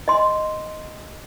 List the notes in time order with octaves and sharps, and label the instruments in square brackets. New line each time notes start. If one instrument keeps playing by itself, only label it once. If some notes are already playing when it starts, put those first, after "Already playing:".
[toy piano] D#5 C6